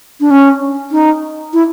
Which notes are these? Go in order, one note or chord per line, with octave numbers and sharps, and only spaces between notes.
D4
C#4
D#4
E4